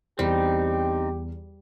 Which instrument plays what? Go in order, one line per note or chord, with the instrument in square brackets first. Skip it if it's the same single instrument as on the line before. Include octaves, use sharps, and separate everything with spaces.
[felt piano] E2 [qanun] G3 [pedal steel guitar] C4 D#4 [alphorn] G4